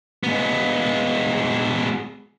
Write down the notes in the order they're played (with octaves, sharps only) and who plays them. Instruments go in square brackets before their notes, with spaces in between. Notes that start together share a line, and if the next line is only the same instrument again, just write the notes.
[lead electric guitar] G#3 B3